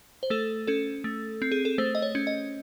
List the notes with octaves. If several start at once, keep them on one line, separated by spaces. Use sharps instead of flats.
C5
A3 A4
C#4 A4
A3
C4
G#4
A4
A3 C5
D#5
C#5
C#4
D#5